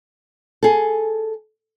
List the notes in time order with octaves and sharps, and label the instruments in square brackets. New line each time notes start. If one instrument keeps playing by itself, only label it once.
[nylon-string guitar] G#4 A4